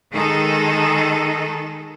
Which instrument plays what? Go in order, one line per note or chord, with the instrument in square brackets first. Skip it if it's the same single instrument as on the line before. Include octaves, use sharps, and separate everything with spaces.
[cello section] D#3 G#3 D#4 G#4 A4